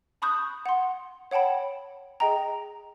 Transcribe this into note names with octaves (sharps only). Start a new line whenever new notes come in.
A5 B5 C#6 D#6 F#6 G6
F#5 C6
C#5 F#5 G5 A5 B5
G#4 D#5 G5 A#5